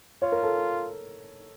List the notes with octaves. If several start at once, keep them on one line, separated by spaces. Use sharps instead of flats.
F4 C#5
A#4
A4